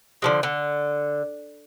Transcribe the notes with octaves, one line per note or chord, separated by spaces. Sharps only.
D3 F3 G#3
D3